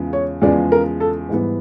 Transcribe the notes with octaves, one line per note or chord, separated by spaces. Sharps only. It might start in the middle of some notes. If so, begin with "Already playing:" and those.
Already playing: E2 C#3 F3 G#3
C#5
E2 C#3 F3 G#3 D5
A#4
A4
G#2 E3 G3 B3